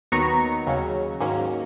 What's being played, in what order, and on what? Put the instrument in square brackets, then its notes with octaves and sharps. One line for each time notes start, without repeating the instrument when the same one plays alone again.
[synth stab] D#2 D#3 F#3 B3 D#4 A#5 C#6
D#2 C#3 F#3 C#4
G#2 D#3 F#3 A#3 C#4